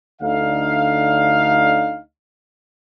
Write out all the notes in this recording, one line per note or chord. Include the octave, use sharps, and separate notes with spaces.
D2 D3 D#4 F5